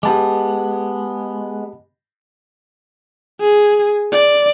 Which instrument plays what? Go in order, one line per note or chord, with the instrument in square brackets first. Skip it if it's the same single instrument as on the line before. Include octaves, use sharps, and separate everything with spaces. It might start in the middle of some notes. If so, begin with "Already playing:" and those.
[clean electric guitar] G#3 B3 [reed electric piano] G4 A5 D6
[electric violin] G#4
D5